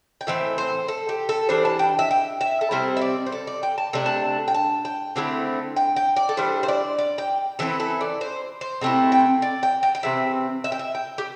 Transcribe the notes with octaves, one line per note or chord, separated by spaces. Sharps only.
G5
A2 E3 C4 E5
C5
A4
G4
A4
E3 G3 D4 C5
A5
G5
E5
G5
E5
A4
C3 G3 C4 E4 C5
E5
D5
C5
A4
D5
G5
A5
C3 A3 D4
A5
G5
A5
G5
D3 A3 C4 E4
G5
G5
D5
A4
E3 G3 D4 C5
C5
D5
D5
G5
E3 C4 E4 A4
A4
D5
C5
C5
C3 A3 C4 E4 A5
G5
D5
G5
G5
G5
C3 E3 C4 E5
E5
G5
E5
G5
G4